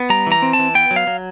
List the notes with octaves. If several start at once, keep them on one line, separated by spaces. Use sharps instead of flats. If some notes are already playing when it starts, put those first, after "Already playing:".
Already playing: B3
G3 A#5
E3
A#5
C4
A5
E3
B3 G5
F#3
F5
F#3